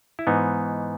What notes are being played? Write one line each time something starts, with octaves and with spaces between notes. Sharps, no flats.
E4
G#2 E3 B3 D#4